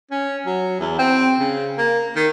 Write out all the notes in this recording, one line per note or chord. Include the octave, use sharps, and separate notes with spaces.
C#4
F#3
E2
C4
C#3
A#3
D#3